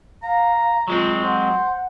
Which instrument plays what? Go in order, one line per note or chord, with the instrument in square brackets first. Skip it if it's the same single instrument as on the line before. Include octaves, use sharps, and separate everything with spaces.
[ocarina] F5 [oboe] A#5
[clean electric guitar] F#3 G#3 C4 [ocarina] F4
[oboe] C5 [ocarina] F#5